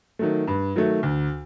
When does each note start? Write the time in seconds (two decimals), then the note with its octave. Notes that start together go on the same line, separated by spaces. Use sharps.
0.19 D#3 F#3 A3
0.48 G2
0.76 D#3 F#3 A3
1.03 D2